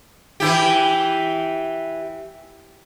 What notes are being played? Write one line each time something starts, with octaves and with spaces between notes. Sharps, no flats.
E3 E4 G4